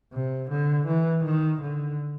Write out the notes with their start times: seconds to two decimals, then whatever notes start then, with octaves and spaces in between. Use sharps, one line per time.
0.13 C3
0.50 D3
0.87 E3
1.24 D#3
1.62 D3